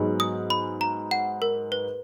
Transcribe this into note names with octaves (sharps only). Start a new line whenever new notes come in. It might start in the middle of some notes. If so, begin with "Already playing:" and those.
Already playing: G#2 F#3 B3 D#4 G#4
D#6
B5
A#5
F#5
A#4
B4